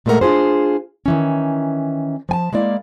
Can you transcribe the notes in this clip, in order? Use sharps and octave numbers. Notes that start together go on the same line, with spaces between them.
A#2 G#3 A3 B3 A#4 F#5
D4 F4 F#4 G#4 C5
D#3 E3 C#4
F3 G#5 A5
G#3 A#3 E4 D5